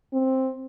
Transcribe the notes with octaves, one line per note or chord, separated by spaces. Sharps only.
C4